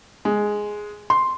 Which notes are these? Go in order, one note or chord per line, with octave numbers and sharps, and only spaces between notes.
G#3
C6